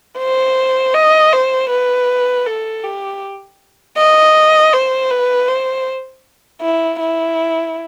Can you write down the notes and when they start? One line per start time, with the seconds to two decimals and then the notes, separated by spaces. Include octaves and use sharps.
0.18 C5
0.94 D#5
1.33 C5
1.70 B4
2.46 A4
2.84 G4
3.97 D#5
4.73 C5
5.11 B4
5.48 C5
6.62 E4
7.00 E4